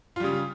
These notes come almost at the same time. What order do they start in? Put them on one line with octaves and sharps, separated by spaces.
F4 G3 C#3